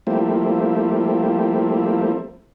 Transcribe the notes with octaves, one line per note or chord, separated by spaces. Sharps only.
F3 G3 A3 A#3 C4 E4